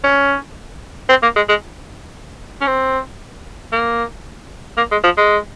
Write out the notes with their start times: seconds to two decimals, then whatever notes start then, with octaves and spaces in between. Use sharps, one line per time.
0.04 C#4
1.09 C4
1.22 A#3
1.36 G#3
1.49 G#3
2.61 C#4
2.67 C4
3.72 A#3
4.77 A#3
4.91 G#3
5.04 F3
5.17 G#3